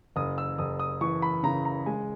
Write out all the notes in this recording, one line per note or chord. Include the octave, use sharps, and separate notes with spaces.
F#1 D#6
E6
F#1 D#6
D#6
E3 C#6
B5
C#3 A#5
A#5
G#3 G#5